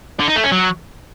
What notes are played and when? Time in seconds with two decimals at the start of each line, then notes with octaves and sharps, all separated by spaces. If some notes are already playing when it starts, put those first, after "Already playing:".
0.20 D3
0.28 D#4
0.36 A3
0.44 C#4
0.52 F#3